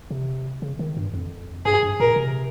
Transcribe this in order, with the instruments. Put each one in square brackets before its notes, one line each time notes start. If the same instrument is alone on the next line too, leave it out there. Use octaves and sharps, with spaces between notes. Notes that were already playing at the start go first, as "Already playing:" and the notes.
[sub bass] C3
C#3
D#3
G2
F2
[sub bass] G2 [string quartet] G#4
[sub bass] G2
[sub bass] A#2 [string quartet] A#4
[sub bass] C3